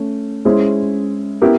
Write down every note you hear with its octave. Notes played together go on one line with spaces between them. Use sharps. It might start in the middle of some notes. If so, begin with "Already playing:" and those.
Already playing: A3 C#4
G#3 C#4 E4 G#4 C5
B3 E4 G4 A#4